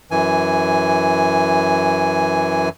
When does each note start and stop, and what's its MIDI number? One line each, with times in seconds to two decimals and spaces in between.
0.11 2.69 42
0.11 2.69 52
0.11 2.69 80